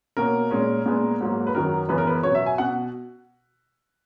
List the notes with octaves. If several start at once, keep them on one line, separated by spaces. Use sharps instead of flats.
B2 A#3 C#4 A#4
A#2 G#3 C#4
A#2 G#3 B3
G#2 F#3 A#3
B4
F#2 D#3 F#3 A#4
F#2 C#3 E3 B3 B4
A#4
B4
B2 F#3 B3 C#5
E5
G#5
B2 F#5